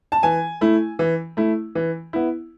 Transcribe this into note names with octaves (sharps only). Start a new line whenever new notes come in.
A5
E3 G#5
A3 E4
E3
A3 E4
E3
B3 E4